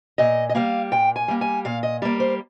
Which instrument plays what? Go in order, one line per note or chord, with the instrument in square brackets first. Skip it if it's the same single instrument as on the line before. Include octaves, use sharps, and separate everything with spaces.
[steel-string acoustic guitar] A#2 D#5
D#5
G3 A#3 F5
A#2 G5
G#5
G3 A#3
G#5
A#2 F5
D#5
G3 A#3 D5
C5